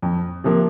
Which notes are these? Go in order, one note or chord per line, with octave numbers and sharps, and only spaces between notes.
F2
C3 F3 A#3